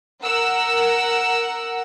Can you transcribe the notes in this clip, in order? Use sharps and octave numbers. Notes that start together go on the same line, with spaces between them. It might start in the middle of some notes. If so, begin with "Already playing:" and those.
A#4 F#5 E6